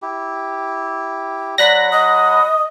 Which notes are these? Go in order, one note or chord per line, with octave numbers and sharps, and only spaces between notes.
E4 G4
F#3 D5 F#5 B5 F#6 A#6
D#5 D#6